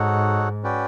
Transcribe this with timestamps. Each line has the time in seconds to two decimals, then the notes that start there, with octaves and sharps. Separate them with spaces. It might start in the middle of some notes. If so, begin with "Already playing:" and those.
Already playing: G#2 D#4 F#4 A4 C#5 F#5
0.63 C#4 F#4 B4 D5 G5